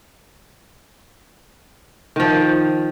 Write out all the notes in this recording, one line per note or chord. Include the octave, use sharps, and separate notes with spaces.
D#3 F3